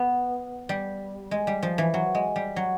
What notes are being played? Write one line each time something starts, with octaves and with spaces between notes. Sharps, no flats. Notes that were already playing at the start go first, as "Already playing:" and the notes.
Already playing: B3
G3
G#3
G3
F3
E3
F#3
G#3
G3
F#3